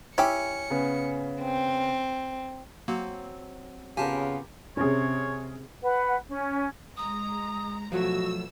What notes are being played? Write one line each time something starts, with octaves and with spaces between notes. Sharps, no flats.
C#4 E4 G4 C#7
C#3 B3
C4
F#3 A#3 C4
C#3 B3 F4 G4 A#4 G#5 A5
C3 C#4 G#4 C#5
B4 F#5
C#4
G#3 A#5 D#6
B2 F3 F#3 A3 F#4 E6